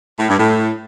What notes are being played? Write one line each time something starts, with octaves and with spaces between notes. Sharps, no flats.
A2
G2
A2